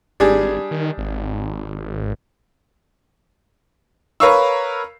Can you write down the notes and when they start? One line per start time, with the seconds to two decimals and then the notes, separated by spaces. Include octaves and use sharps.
0.20 G#1 G3 D4 G#4
0.71 D#3
0.98 G#1
4.20 A#4 B4 C#5 F5 C#6 E6